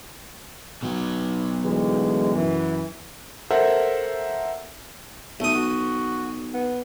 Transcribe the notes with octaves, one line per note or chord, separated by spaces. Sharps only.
B2 F#3
D2 E3 G#3
F#2 E3
A4 A#4 C5 E5 F#5
B1 A3 D#6
F#4
B3